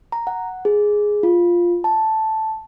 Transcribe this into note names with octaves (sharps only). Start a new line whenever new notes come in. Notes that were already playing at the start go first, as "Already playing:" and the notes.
A#5
F#5
G#4
F4
A5